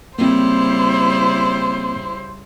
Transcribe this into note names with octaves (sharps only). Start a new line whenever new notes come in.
C#3 G3 A#3 C4 E4 C5